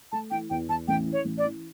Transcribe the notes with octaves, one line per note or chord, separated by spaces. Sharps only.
A3 A5
E3 G5
E2 G5
E2 A5
A1 G5
E3
C#5
A1
D5
E3